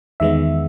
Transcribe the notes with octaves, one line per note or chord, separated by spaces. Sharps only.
E2 D#3 G#3 B3 E5